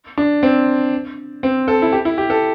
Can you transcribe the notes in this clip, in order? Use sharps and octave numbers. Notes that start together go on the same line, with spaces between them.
D4
C4
C4
A4
E4
G4
E4
G4
A4